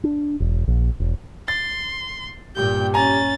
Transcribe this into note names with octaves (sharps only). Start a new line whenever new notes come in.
D4
E1
A#1
E1
C6 A6
G2 A#2 G4 G5 G6
C#4 G#5 A#5 A6